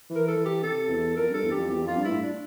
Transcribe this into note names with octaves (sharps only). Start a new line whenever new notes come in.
E3
A#4
A4
E3
G4
C3 A4
E2
F2 A#4
G2 A4
E2
G2 G4
F2
E2 G4
F2 F4
G2
A2 E4
D4